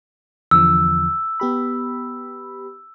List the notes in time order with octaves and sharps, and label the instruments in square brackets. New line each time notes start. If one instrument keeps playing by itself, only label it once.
[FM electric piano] E2 D3 F3 [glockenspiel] E6
[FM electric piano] B3 G4 B5